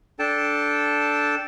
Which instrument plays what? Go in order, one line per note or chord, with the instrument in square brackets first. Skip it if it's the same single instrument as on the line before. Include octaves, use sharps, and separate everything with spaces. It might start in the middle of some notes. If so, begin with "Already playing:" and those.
[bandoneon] D4 A4 G5 A5